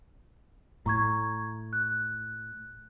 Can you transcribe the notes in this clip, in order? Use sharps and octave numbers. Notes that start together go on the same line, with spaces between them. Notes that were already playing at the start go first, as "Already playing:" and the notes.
A2 A#5 C#6 G#6
F#6